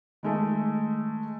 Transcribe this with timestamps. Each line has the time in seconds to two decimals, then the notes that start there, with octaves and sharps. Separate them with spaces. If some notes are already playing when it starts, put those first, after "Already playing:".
0.23 D#3 G#3 A3